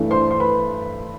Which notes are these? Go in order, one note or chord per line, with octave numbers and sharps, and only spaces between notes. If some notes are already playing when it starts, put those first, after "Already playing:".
Already playing: G2 E3 A3
C5 C6
C6
B4 B5